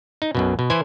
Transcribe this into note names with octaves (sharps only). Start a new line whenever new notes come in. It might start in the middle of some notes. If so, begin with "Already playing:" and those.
D#4
B1 F#2 B2
B2
E3 E4 C5 G#5